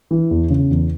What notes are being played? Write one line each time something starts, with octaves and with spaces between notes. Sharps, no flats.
E3
E2
C#3
E2